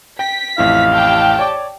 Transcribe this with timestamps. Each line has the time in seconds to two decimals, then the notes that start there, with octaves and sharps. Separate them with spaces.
0.19 G5 B6
0.58 A1 F2 E4 F5
0.91 G4 G5 A5
1.39 C#5 D5 D6